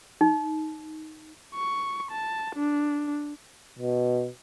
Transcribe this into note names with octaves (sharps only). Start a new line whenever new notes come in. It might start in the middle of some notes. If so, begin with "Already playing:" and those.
D#4
C#6
A5
D4
B2